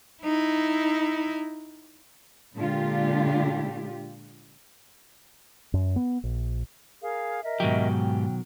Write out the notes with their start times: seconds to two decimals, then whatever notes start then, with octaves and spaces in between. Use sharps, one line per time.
0.24 D#4 E4
2.57 A#2 D3 G#3 D4 F4 G4
5.74 F#2
5.96 B3
6.24 A#1
7.01 G#4 A#4 F5
7.43 A#4 D#5 E5
7.60 G#2 B2 D#3 F#3 G4
8.04 G5